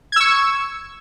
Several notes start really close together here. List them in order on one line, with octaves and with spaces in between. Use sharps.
G#6 E6 C#6